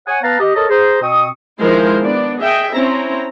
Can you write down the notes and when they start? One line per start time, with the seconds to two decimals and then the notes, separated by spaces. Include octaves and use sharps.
0.07 C#5 F#5 G#5
0.23 B3 B4 F5 A5 A#5
0.39 G4 D#5
0.55 A4 A#4 C#5 D#5 A5 A#5
0.69 G#4 C5 A#5
1.01 B2 C4 C#6 D#6
1.59 D#3 F3 G#3 E4 A#4 C5
2.02 B3 D4 D5
2.40 G#4 D#5 E5 G5
2.74 C4 C#4 E4 A#5